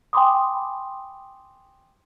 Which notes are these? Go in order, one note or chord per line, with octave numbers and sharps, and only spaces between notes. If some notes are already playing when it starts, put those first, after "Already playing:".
G5 G#5 B5 C6 D6 D#6